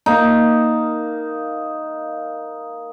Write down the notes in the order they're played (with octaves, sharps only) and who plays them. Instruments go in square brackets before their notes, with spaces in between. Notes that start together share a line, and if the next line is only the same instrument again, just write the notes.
[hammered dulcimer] A#3 D#4